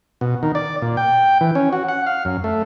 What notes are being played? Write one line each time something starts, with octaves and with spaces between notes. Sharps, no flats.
B2
D#3
D5
A#2
G5
E3
C#4
F#4
F#5
F5
F#2
A3